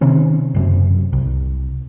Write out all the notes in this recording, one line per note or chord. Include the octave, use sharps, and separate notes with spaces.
C3 D#3 C4 C#4
F#1 F#2 C3
C2